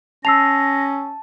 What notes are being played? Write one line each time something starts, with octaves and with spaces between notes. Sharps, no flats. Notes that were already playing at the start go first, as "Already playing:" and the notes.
C#4 A5 E6 A#6 C7 F7